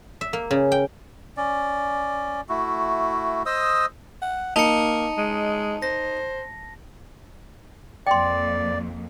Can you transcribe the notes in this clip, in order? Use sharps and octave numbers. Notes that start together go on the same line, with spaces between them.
E5
A#3
C#3
G5
C#4 D5
A3 E4 F#4
C5 D#5 D#6 E6
F#5
A#3 D#4 A5 C#7
G#3
C5 A#6
F2 A#3 D5 G5 C6